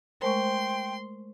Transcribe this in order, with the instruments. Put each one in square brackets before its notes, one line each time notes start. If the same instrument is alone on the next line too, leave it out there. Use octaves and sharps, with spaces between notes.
[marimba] G#3 A3 A#4 [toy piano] C5 G#5 C#6 [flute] G5 [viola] C6